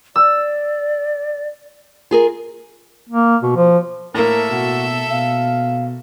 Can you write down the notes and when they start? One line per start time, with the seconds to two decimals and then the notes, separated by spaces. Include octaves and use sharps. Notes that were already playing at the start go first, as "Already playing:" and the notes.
0.16 D5 E6
2.11 F4 G#4 A#4
3.09 A#3
3.42 B2
3.56 F3
4.15 A2 A#3 A4 A#4 E5
4.50 B2 F#4
5.10 B2 F5